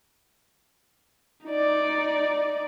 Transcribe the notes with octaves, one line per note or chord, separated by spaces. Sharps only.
D#4 D5